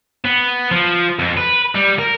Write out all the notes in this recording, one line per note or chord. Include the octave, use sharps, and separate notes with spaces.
B3
F3
F2
B4
G3
A#4